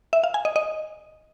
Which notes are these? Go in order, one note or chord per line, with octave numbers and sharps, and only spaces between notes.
E5
F5
G#5
D#5
D#5